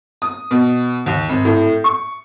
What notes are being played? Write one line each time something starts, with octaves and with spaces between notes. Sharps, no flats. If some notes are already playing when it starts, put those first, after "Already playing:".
D#6
B2
D#2
G#1
A2
C#6